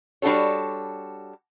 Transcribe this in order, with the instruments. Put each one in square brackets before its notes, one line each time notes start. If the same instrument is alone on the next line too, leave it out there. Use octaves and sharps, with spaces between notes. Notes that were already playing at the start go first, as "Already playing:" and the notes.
[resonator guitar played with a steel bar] G3 D4 F#4 A4 C#5